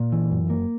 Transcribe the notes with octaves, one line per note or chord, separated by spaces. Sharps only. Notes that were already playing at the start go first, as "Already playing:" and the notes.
Already playing: A#2
E3
F#2
A#3